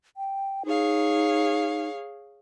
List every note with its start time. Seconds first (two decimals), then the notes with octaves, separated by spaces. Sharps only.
0.17 G5
0.65 D#4 G#4 C#5 F5